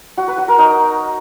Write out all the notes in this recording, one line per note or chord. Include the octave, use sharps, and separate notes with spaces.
F#4
B4
F#4
A#4
D#4